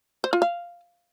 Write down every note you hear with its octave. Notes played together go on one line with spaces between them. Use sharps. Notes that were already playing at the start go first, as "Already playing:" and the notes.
C5
F4
F5